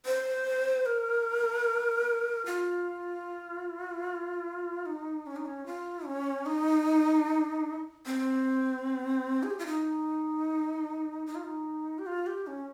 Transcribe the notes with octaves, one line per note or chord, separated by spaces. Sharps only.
C5
A#4
F4
D#4
C#4
D#4
C#4
F4
C#4
D#4
C4
G#4
G4
F4
D#4
D#4
F4
D#4
G4
F4
G4
C#4